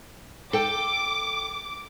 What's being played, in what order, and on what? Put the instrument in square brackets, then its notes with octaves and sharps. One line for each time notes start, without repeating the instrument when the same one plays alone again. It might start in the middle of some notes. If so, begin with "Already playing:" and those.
[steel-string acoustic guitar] A4 G5 [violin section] D6